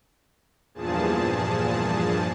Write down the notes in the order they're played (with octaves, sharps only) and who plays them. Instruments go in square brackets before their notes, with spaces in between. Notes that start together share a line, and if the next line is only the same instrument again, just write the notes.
[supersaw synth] E2 G2 A#2 F3 G#4 A5